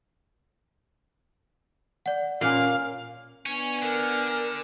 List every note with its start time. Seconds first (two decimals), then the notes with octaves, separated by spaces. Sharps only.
2.06 D5 F#5
2.41 A#2 A#3 C#4 F5 G#5 C6 C7
3.46 B3 C#4 D4 G#5
3.82 D3 A#4